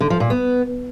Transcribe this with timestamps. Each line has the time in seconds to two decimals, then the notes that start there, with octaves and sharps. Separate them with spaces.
0.01 D3
0.10 F3
0.20 A#2
0.30 B3